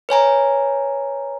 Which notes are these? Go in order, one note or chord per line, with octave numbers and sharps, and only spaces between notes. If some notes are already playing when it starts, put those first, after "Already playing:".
B4 C#5 G#5 A#5